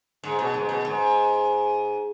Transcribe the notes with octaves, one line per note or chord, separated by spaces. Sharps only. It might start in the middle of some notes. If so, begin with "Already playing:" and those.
G#2
B2
G#2
B2
G#2